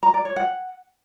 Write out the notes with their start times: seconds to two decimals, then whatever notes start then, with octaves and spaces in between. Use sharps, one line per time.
0.03 A#5
0.14 D5
0.25 C#5
0.36 F#5